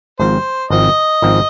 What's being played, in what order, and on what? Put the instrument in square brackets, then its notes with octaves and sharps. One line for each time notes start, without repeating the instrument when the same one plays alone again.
[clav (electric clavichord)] G#1 G#2 F3 C4 [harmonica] C5
[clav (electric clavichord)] G#1 G#2 F3 C4 [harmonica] D#5
[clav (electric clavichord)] G#1 G#2 F3 C4